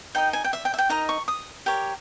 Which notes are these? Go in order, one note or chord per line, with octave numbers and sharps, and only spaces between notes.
D#4 A#4 D#5 G5
G#5
G5
E5
G5
E5
G5
D#4 A#4 D#5 A#5
C#6
D#6
G4 A#4 C#5